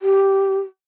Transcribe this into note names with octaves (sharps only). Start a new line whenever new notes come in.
G4